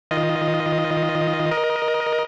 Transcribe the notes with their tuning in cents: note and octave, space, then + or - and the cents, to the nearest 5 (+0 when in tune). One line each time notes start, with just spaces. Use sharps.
D#3 +30 F4 +0 D#5 +0
A#4 +25 D#5 +0